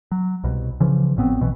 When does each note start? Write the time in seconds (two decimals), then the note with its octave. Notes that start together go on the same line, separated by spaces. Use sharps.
0.12 F#3
0.44 C2 B2
0.80 C#3 E3 F3
1.17 G#1 A2 B3 C4
1.41 B1 B2 E3